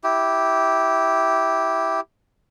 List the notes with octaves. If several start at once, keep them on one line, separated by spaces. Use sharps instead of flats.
E4 G4